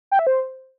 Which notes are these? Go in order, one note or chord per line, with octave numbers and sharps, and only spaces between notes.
G5
E5
C5